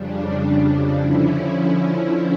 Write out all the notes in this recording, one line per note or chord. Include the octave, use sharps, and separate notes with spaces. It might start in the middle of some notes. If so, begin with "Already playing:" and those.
Already playing: F2 C#3 G3 D4
D3 F3 C#4 E4